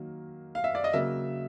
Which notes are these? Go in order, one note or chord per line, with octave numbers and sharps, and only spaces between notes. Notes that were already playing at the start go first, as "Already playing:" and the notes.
Already playing: D#3 F#3 A#3
F5
E5
D5
D#5
C#3 F#3 A#3 E5